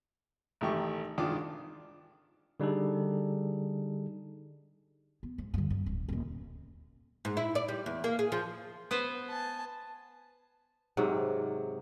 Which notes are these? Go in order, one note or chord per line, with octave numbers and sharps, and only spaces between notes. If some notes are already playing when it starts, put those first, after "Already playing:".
A1 D#3 A3 G4 C#6
G#1 D#3 D4 F4 D6
D3 G3 D#4 G#4 A4
B3
G#2
G2 D3
G2
D1
D#1 A#2
G#2
E4
D5
G3
E2
A#3
G#4
F3
B3 B4 C5
G#5 A5
G#2 C3 F#3